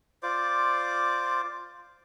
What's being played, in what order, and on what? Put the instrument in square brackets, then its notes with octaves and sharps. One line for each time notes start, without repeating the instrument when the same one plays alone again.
[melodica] F4 C5 D5 D6